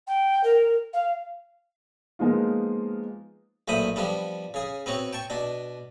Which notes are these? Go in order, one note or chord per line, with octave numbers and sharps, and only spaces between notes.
G5
A#4
F5
F3 G#3 A#3 B3 D#4 F4
B1 A#2 A3 C5 B5 D#6
F3 G3 B3 D4
C#3 G#4
B3 C4 F#4 C#5
G5 A5 C#6
B2 D4